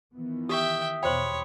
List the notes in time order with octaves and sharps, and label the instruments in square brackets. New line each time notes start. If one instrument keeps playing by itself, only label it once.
[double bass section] D#3 E3 B3
[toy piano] G4 C#6 [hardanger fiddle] E5 G5 [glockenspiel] D#6 B6 G7
[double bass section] E2 B2 [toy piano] C5 G5 [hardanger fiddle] C#5 [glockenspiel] B5 C6